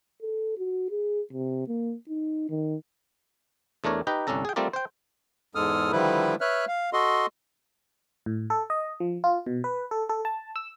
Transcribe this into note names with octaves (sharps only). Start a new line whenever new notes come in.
A4
F#4
G#4
C3
A#3
D#4
D#3
E2 A3 D4 A#4 C#5
D#4 G4 B4 G5 A#5
G1 C2 C#4 D4 A4 A#5
G#4 G5
G3 A3 C4 F4 A#4 D5
C5 G5
E2 G#2 G#3 A4 D#6 F6
D3 D#3 F3 G3 E4 B4
B4 C#5 E5 F6 F#6
F5
F#4 A4 D#5 C6
A2
A4
D#5
F3
F4
B2
B4
A4
A4
A5
E6